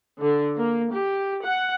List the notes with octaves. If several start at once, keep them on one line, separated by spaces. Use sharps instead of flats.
D3
A#3
G4
F#5